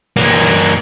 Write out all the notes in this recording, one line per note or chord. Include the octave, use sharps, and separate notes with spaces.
E3 A#3